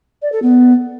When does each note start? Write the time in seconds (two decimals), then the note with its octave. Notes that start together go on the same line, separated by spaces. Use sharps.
0.22 D5
0.32 A4
0.42 B3